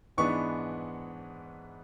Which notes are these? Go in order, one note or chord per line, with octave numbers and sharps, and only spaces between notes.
G#2 E3 G#3 B3 D4 C#6